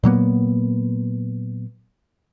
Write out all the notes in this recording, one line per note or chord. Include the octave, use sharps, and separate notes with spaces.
A#2 F#3 A#3 B3